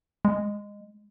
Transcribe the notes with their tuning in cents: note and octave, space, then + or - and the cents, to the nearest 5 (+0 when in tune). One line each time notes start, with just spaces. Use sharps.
G#3 -15